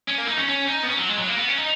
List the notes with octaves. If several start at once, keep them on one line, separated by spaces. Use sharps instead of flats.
C#4
A#3
D#4
C#4
C#4
D#4
B3
C#4
F#3
G#3
F#3
A#3
B3
C#4
D#4